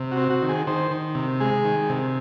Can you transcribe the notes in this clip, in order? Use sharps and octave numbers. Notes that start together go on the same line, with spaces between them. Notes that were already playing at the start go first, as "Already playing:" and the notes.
Already playing: C3
F#4
C4
F#4
D#3
G#4
D#3 C5
D#3
C3
G#3 G#4
D#3
C3